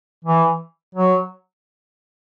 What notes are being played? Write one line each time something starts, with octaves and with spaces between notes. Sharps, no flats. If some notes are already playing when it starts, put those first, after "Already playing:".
E3
F#3